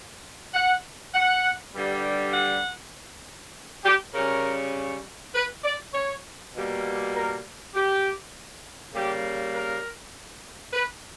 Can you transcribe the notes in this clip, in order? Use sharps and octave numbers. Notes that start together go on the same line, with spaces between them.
F#5
F#5
G2 D3 G3
F#5
G4
C#3 G3 C#4 A#4
B4
D5
C#5
B2 G3 A#3
A#4
G4
C#3 G3 A#3 G4
A#4
B4